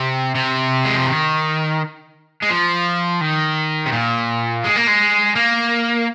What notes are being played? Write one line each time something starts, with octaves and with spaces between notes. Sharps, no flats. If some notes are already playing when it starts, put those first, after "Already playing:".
Already playing: C3
C3
G#3
F3
D#3
G#3
F3
D#3
C3
A#2
G#3
A#3
G#3
A#3